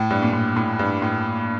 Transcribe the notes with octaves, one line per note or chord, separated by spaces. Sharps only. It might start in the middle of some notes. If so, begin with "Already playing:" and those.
Already playing: A2
G2
A#2
A2
A2
G2
A2